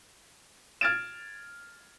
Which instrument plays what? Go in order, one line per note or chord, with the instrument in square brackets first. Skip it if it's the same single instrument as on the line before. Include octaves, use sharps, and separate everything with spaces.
[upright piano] F6 G#6 A6 D7 E7